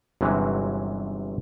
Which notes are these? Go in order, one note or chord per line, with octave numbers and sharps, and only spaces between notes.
G1 C3 E3 F#3 G#3 C#4